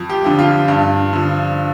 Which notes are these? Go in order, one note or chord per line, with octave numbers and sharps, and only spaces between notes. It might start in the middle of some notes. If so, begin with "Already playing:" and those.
Already playing: F2
G4
D3 F3
F4
G2
D3 F3